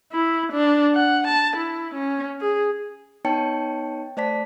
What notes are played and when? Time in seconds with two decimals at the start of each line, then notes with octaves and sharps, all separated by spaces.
0.12 E4
0.53 D4
0.94 F#5
1.27 A5
1.57 E4
1.94 C#4
2.41 G#4
3.25 B3 D#4 C#5 G5 A5 C#7
4.17 A3 C5 D5 A5 B6